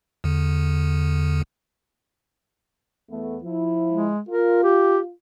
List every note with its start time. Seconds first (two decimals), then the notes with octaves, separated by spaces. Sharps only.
0.24 E2 D3
3.09 E2 A3 B3
3.43 F3 E4
3.90 G#3
4.29 F4 A#4
4.64 G4